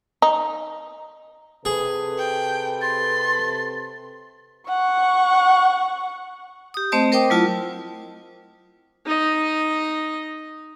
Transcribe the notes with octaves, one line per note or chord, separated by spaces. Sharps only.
D#4
C3 G#4 A4 B4
G5
C6 A6
F#5 C#6
G4 D#6
A3 C4 C5 D#5 A5
A#4 C5 D#5 G5 D6 D#6
F#3 A3 E4 F4 A5
D#4 D#5